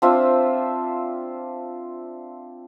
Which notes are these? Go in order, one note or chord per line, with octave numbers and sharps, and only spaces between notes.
C4 D4 F4 E5